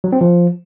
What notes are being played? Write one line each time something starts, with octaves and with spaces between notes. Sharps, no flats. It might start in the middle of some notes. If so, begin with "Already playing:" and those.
F#3
C4
F3